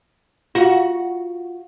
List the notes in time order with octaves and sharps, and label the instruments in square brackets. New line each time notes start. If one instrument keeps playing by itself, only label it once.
[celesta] F4 F5 [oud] F#4